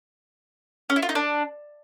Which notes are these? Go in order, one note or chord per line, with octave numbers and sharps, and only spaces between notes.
C#4
E4
F4
D#4
D4